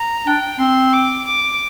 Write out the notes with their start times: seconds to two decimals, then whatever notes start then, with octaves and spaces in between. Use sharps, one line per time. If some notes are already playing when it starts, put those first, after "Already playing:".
Already playing: A#5
0.27 D4 G5
0.60 C4 C6
0.93 D6
1.27 D6